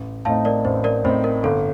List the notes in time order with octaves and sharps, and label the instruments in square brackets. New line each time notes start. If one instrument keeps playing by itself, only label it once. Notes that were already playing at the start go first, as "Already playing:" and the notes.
Already playing: [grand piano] A1
[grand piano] A2 A3 C4 D#4 [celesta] F5 A5
[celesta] A#4 D5
[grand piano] A1 [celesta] C5
[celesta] A#4 D5
[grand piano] A2 A3 C4 D#4 [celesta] C5
[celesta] A#4
[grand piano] G1 [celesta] A4